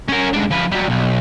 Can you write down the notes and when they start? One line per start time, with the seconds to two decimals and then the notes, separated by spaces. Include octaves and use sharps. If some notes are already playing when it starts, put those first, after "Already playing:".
0.09 C#4 A#4
0.33 G#2 D4
0.50 F3 B4
0.72 F#3 G3
0.88 B1